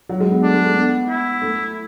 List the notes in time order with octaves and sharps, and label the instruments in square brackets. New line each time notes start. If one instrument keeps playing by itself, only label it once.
[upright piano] F#3
G#3
B3
[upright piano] A3 [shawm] D4
[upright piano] G#3
A3
B3
[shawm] E4
[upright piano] A3